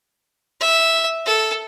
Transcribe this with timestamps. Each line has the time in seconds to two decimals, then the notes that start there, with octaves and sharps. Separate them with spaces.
0.61 E5
1.26 A4